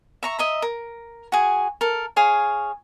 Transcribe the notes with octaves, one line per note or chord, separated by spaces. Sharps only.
E5 A#5 C#6
D#5 E5 A#5
A#4
F#4 G#4
A4 A#4
G#4 C#5 F5